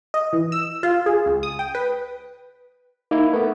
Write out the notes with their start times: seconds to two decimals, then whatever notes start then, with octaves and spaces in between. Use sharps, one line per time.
0.14 D#5
0.33 E3
0.52 E6
0.83 F4
1.06 G#4
1.26 C#2
1.43 D#6
1.59 G5
1.75 B4
3.11 A#3 D#4 E4
3.33 A3 B3 A#4 B4